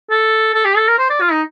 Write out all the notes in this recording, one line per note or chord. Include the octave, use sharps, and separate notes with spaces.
A4
A4
G4
A4
A#4
C5
D5
F4
D#4